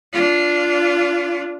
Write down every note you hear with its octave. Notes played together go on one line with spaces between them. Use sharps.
D4 F4